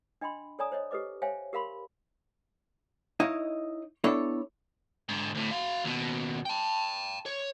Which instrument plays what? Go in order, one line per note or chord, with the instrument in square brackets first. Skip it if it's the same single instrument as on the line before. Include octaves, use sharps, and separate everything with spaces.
[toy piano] D4 D#5 G5 B5 C6
A4 C#5 D5 G#5 A#5 D#6
C5 C#5 D#5
G4 A4 B4 D#5 D6
C5 C#5 E5 F5 G5 G#5
G4 A#4 F5 B5 C6
[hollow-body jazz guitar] D#4 E4 C#5 D#5 F5
B3 D4 E4 A4 C#5
[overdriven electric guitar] G#2 D3
D2 A2
F#4 F5
D#2 B2
G5 A5
C#5